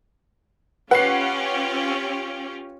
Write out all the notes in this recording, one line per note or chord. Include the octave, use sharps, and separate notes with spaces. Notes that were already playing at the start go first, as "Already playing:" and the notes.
C#4 F4 G4 B4 F#5 C7